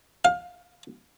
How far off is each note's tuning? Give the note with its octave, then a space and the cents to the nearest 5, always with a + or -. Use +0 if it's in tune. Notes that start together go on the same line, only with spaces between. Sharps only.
F5 +25